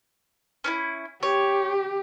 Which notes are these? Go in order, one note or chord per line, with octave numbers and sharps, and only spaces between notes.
C#4 D4 E4
G4 C#5